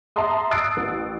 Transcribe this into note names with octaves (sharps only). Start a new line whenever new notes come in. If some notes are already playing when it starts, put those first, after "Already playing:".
E5 A5 A#5 C6 D#6
D#6 E6 F#6 A6 C7 D7
A1